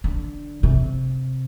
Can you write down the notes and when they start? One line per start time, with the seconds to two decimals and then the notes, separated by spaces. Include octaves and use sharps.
0.04 D3
0.63 C3